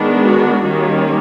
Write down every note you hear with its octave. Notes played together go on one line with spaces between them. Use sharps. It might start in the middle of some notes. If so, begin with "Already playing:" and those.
Already playing: D#3 G#3 B3 D4
F#4
D#3 G3 A#3 C#4